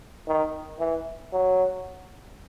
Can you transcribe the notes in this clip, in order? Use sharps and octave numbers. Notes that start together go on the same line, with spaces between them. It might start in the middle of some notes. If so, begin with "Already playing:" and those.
D#3
E3
F#3